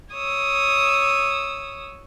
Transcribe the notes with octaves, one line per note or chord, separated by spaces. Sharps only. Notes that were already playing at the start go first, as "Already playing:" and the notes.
C#5 D#6 E6